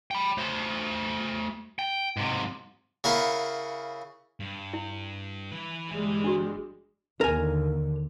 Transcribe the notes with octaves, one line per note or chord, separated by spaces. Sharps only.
G5 B5
A3 C5
G5
G#2 C3
C#3 E4 A#4 B4 F5 F#5
G2
E4
E3 B4
G1 E3 G3 G#3
D4 F#4
D#2 D3 A#4 G#5